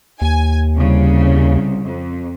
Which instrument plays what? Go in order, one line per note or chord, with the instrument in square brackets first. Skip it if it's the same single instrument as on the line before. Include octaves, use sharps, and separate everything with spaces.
[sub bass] D#2 [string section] G#5
[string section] C2 C#3
F2